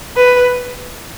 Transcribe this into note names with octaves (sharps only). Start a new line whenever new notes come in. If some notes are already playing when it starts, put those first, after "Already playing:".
B4